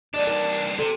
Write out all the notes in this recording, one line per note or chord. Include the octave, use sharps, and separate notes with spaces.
C2 D4 D5 D#5
D#4 A#4 D5
C3 A4